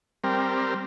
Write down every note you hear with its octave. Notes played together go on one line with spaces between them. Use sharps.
G3 C4 A#4